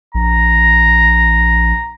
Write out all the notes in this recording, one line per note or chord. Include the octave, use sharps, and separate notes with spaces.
A#1 A#5